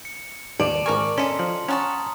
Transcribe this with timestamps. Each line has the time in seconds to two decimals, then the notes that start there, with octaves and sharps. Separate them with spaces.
0.05 C#7
0.60 D#2 D5 A5 F7
0.86 G#1 A#4 G#5 C#6 D6 F6
1.18 C#4 A4 D#5 A#5 C6 B6 C#7
1.39 F3 F#7
1.68 C#4 F#5 A5 A#5 C#6 D#6 F6